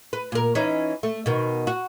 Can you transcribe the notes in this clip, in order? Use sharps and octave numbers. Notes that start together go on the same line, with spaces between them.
B4
A#2 A#4
E3 C#4 D#4
A3
B2 D#3
F#4